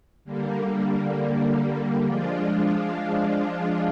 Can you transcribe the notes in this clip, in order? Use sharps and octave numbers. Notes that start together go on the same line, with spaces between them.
D3 G3 A#3
F3 G#3 D4 F4